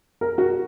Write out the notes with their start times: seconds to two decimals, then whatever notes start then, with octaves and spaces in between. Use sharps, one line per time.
0.21 A#4
0.38 F#4